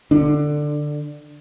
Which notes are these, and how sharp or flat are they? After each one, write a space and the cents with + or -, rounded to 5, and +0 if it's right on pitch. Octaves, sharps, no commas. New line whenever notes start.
D3 +15 D4 +10